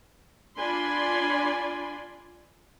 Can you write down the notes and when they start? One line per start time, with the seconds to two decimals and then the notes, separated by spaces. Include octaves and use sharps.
0.59 D4 F4 D5 G#5 B5 C6